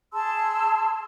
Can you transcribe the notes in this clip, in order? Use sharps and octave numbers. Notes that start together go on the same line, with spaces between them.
G#4 A5 C6 E6